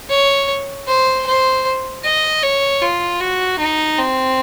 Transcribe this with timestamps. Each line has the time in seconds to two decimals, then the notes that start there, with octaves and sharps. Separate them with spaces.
0.09 C#5
0.88 C5
1.26 C5
2.04 D#5
2.43 C#5
2.82 F4
3.20 F#4
3.59 D#4
3.98 C4